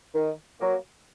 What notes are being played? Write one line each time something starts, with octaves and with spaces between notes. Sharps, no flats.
D#3
F#3 A#3